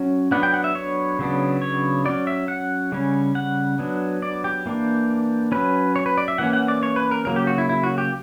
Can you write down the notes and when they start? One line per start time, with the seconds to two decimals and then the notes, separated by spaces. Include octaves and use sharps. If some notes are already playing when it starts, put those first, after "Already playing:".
Already playing: F#3 C#4
0.31 F#3 B3 D4 F#5
0.43 G5
0.54 F#5
0.64 E5
0.75 C#5
1.19 C#3 F#3 B3 D4
1.62 C#5
2.05 F#3 C#4 D5
2.27 E5
2.48 F#5
2.92 C#3 G3 C#4
3.35 F#5
3.79 F#3 B3 D4
4.22 D5
4.44 G4
4.66 E3 A#3 D4
5.52 F#3 C#4 B4
5.96 C#5
6.06 B4
6.18 D5
6.28 E5
6.38 E3 A#3 C#4 F#5
6.53 F#5
6.68 D5
6.83 C#5
6.96 B4
7.11 A#4
7.25 C#3 F#3 A#3 A#4
7.36 G4
7.47 F#4
7.58 E4
7.69 E4
7.84 F#4
7.98 G4